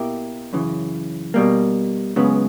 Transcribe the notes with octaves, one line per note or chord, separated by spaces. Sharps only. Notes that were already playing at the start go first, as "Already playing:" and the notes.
Already playing: B2 A#3 E4 G4
F#2 C#3 E3
B2 G3 A#3
C#2 C#3 F#3 B3